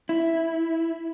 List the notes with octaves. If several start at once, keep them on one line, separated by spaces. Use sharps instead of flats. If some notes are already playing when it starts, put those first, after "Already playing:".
E4